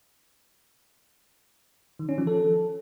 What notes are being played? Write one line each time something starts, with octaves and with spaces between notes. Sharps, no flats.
D#3
C#4
F3
A4